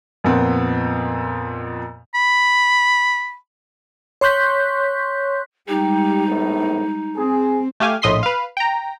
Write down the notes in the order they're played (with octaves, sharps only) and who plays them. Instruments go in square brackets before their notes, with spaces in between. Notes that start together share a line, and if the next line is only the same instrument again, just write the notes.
[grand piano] F2 A#2 B3 C4
[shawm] B5
[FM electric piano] C#5 C6 C#6 F#6 G6 B6
[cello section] G3 G#3 [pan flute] D#4 [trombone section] G4
[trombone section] A#1 A2 B3
[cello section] C4 [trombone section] G#4
[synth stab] A3 G4 F5 G#5
A#1 A2 D#5 C6 B6 C7
B4 F5
G5 A#5